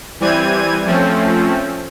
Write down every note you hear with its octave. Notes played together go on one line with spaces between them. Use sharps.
E3 G3 C4 G#6 D#7
F3 A3 C4 C#4